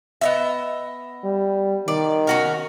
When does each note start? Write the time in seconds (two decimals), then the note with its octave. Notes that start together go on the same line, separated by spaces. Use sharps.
0.21 B3 D#5 E5
1.24 G3
1.88 D#3 D5
2.27 C#4 F#4 A#4